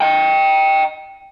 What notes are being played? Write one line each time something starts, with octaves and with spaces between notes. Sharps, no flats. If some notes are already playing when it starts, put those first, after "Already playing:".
D#5 G5